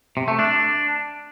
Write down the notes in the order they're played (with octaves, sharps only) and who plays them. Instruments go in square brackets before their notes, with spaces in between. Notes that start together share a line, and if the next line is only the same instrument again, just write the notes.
[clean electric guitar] C3
A3
D4